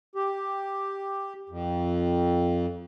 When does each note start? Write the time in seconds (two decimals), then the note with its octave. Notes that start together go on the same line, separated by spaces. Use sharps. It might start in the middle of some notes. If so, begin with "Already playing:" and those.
0.15 G4
1.49 F2